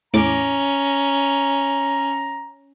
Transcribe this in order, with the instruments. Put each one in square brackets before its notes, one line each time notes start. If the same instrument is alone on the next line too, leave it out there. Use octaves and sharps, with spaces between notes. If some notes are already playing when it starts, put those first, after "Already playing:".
[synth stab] E2 A2 D6 [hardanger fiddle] C#4 [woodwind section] A#5